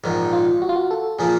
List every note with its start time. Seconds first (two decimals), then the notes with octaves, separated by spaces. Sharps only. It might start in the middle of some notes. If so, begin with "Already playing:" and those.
0.04 A#1 G#2 D#3
0.33 F4
0.62 F#4
0.69 F4
0.76 F#4
0.91 A4
1.19 A#2 F3 A#3 G#4